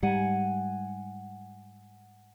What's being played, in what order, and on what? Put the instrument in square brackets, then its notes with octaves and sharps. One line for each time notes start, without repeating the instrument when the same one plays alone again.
[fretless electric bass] G#2 G3 [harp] F#5 G#5